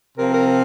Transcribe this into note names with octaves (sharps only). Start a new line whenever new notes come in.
C3 F3 A#4
A#4